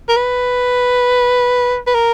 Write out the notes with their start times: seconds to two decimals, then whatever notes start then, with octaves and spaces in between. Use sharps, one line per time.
0.09 A#4
0.17 B4
1.87 B4
1.95 A#4